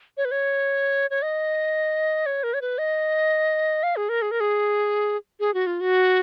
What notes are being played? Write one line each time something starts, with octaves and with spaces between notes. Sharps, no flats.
C#5
B4
C#5
C#5
D#5
C#5
A#4
C#5
B4
D#5
F5
G#4
A#4
G#4
A#4
G#4
G#4
F#4
F4
F#4